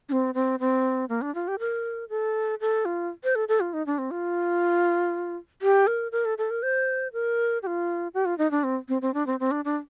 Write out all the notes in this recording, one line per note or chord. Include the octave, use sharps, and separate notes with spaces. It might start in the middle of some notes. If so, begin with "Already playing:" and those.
D4
C4
C4
C4
A#3
D4
F4
G4
A#4
A4
A4
F4
C5
A4
A4
F4
D#4
D4
C4
F4
G4
A#4
A#4
A4
A4
A#4
C5
A#4
G4
F4
G4
F4
D#4
D4
C4
C4
C4
D4
C4
C4
D4
D4